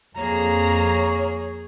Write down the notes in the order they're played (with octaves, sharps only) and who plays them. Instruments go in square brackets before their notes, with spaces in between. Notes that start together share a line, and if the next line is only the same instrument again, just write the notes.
[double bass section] F2 [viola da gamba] A#3 G#4 [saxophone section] C#5 [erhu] A#5